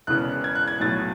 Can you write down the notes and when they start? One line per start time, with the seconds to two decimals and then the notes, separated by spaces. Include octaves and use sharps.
0.07 E1 E2 C#3 E3 F#6
0.44 G#6
0.55 F#6
0.68 G#6
0.80 B1 A2 F#3 A6